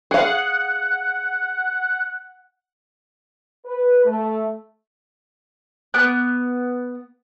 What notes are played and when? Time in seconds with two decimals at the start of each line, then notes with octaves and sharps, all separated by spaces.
0.11 G#4 F5 F#5
3.66 B4
4.05 A3
5.94 B3 D6 F#6